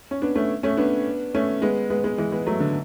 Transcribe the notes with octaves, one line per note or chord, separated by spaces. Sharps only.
C#4
B3 D4
A3 C#4
A3 C#4
B3 D4
A3 C#4
G#3 B3
G#3 B3
G#3 B3
E3 G#3
G#3 B3
F#3 A3
D3